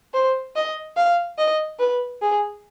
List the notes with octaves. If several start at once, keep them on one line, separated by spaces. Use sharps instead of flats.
C5
D#5
F5
D#5
B4
G#4